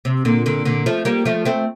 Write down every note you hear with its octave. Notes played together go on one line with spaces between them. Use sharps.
C3
A#2 D3
A#2 D3
A#2 D3
F3 A3
G3 A#3
F3 A3
A3 C4